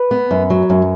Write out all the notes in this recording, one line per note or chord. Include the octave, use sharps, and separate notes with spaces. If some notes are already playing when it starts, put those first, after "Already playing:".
Already playing: B4
B3
F#2
F#3
F#2